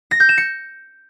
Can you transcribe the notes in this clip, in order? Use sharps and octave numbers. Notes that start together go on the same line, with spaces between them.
A#6
G6
E7
C#7